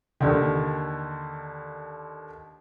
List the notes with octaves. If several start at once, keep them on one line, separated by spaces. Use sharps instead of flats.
D#2 D3 D#3